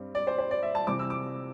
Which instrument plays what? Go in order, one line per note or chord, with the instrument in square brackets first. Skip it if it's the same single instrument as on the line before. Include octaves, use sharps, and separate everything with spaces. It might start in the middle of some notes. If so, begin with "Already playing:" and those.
Already playing: [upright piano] G2 G3 C4
D5
C5
C5
D5
E5
A5
C3 E3 G3 C4 D6
E6
D6